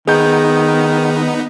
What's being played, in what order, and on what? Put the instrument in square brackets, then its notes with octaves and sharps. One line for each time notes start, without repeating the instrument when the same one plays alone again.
[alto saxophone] D#3 [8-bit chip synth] B3 D#4 [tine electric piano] G#4 G6